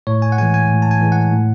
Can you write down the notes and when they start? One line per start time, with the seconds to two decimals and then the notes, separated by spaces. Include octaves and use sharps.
0.07 A2 C#5
0.22 G#5
0.32 F#5
0.38 E3 G#3 G#5
0.54 G#5
0.70 A2
0.82 A5
0.91 G#5
1.01 E3 G#3
1.12 F#5
1.33 A2